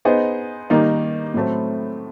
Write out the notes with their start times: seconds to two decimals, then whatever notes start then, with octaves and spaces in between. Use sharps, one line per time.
0.05 B3 D#4 G#4 C5 D#5
0.70 D#3 G3 A#3 D#4
1.34 A2 F#3 A3 C4